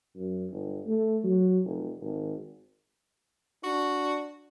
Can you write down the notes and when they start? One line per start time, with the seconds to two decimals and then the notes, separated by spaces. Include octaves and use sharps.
0.16 F#2
0.51 G1
0.86 A3
1.24 F#3
1.64 F1
2.01 G#1
3.64 D4 F#4